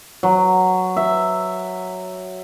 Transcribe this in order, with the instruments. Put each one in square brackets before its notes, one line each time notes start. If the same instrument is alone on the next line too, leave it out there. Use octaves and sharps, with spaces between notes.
[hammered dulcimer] F#3
E5